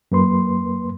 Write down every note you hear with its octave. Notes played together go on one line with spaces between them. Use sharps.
F#2 A#3 B4 C6